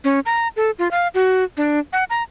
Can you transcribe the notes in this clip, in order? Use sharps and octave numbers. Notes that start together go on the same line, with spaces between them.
C#4
A#5
A4
F4
F5
F#4
D4
F#5
A#5